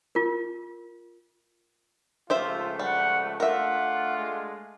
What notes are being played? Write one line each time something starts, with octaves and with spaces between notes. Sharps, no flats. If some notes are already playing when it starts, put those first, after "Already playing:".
F4 A#4
C#2 F3 A3 F4 G4 C5 E5
G3 F#5
A3 D4 F4 A#4 E5 F#5
G#3